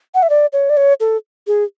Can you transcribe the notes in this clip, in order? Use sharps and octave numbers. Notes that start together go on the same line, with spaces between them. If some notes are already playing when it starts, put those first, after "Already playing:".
F#5
E5
D5
C#5
D5
C#5
A4
G#4